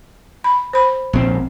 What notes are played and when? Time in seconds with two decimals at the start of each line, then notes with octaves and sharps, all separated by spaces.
0.44 B5
0.73 C5 B5
1.13 A#1 C4